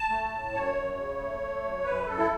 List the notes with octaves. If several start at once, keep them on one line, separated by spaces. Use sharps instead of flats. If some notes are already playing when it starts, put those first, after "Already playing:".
Already playing: A5
A3
A2
F#2 C#5
F#2
C#3
A3
A3
F#2
F#2 B4
F#2 A4
E4